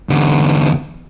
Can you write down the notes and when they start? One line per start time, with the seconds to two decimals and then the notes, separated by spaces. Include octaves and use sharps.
0.09 E2 D3